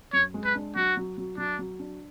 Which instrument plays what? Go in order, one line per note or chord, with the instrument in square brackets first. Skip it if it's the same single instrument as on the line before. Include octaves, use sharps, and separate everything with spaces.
[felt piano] F#2 [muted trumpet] C#5
[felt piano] G#3
[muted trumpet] B4
[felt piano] D4
[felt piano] F#3 [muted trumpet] F#4
[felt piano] F#3
F#3
[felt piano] F#3 [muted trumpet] D4
[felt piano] F#3
D4